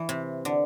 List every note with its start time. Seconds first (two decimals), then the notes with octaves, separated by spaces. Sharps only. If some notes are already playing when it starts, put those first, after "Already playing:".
Already playing: E3
0.09 C3
0.45 D3